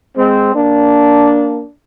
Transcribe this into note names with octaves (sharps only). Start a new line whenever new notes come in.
G#3 C4
A#3 D4